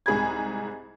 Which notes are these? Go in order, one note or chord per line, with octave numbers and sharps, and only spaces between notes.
C2 G#2 G#4 B5 G#6